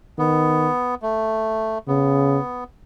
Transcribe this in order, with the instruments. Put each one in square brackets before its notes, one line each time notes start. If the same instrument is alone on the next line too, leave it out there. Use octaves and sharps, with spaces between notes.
[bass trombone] D#3 [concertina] B3
[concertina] A3
[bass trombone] C#3 [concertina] B3